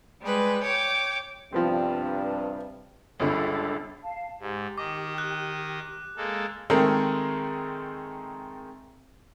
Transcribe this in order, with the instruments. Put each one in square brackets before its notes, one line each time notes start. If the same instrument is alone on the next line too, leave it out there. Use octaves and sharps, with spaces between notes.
[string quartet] G3 G#3 B4
C#5 G5 D6
[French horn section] G2 C3 [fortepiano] F3 B3 C4
[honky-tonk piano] G1 C#2 D3 [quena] A4
[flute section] F5 A5
[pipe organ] G#2 [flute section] G4
[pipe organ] D#3 D#5 [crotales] D6
[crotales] F#6
[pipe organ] G#3 A#3 A4
[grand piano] D#3 G#3 A3 C4 A4 A#4